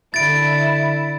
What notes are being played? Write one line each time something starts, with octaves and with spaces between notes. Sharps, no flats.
D3 E4 A6 D7